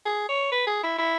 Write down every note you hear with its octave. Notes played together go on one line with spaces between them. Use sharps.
G#4
C#5
B4
G#4
E4
E4